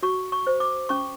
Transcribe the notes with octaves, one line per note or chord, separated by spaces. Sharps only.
F#4 C#6
C#6
C5
D6
C#4 C#6